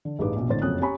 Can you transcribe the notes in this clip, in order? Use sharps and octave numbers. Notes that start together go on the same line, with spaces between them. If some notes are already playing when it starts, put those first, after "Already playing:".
D3
A1 G2 D#4 G#4 B4 D6
A#1 B2
G#1 A2 D3 C5 A6
F#1 F2 F#3 C#4 D#6 F#6
C#4 G4 G#5 A#5 B5 C#6